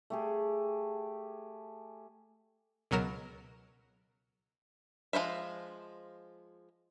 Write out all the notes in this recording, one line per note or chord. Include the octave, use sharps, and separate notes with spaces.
A3 G4 G#4
C#2 B2 F#3 A#4 E7
F3 G#3 C5 E5